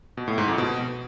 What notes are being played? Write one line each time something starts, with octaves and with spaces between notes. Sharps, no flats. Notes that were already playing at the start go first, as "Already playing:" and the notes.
B2
A2
G#2
F2
B2